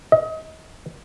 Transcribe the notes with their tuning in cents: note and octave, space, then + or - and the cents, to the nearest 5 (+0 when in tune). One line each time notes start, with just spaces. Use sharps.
D#5 +30